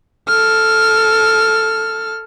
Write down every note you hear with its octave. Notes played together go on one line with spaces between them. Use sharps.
A4 F6